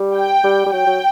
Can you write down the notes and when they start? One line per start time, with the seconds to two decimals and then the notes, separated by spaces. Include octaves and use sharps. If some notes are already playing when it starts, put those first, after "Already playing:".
Already playing: G3
0.15 G5
0.44 G3
0.66 G3
0.72 F#3 G5
0.87 F#3